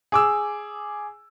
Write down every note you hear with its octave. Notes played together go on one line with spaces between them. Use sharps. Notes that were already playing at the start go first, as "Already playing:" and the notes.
G#4 D6 E6